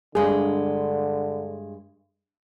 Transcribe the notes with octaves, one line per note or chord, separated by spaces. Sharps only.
G2 D3 G#3 G#4